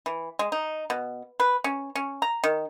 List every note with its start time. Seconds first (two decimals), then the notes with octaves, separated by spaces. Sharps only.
0.06 E3
0.39 G#3
0.52 D#4
0.90 B2
1.40 B4
1.64 C#4
1.95 C#4
2.22 A#5
2.44 D#3